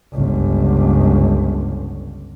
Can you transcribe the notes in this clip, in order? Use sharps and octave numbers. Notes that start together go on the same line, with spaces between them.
G1 C#2